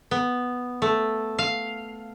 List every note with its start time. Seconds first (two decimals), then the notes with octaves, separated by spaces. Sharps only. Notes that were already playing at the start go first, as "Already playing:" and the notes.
0.11 B3
0.82 A3
1.39 F5